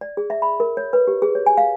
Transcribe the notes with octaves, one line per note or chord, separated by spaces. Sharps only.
D5
G#4
E5
B5
A#4
C#5
B4
G4
G#4
C#5
G#5
F5